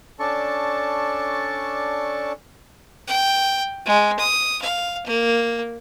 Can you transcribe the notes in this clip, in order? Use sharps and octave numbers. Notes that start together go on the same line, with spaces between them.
C#4 D4 A4 D5 A5 C#6
G5
G#3
D#6
F5
A#3